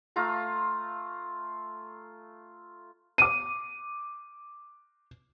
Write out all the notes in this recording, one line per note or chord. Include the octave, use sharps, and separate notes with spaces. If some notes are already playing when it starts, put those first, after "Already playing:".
A3 F4 F5 A#5
D6 D#7